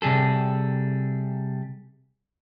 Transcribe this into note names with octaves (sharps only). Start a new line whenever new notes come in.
C3 G3 G#4 A4